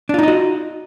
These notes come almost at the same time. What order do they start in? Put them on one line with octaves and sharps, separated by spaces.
D4 F4 D#4 D#5 F#4